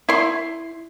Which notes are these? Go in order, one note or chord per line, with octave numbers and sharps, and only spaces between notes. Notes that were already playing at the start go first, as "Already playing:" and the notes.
E4 C6